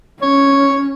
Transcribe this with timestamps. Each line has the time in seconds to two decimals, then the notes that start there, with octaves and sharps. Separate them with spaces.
0.22 C#4 C#5